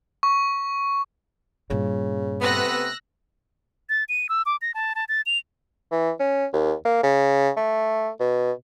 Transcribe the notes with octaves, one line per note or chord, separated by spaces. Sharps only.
C#6
G2 A#2 C#3
C3 A3 B3 E6 F#6 A#6
A6
D#7
E6
D6
A#6
A5
A5
A6
F7
E3
C#4
D#2
A#3
C#3
A3
B2